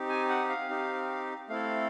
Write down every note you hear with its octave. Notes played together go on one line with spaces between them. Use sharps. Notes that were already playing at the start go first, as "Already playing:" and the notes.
Already playing: C4 D#4 G4
G#5
F#5
F5
C4 D#4 G4
A3 C4 E4 A4 F5